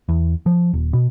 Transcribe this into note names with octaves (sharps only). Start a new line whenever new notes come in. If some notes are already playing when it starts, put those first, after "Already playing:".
E2
F3
D#1
B2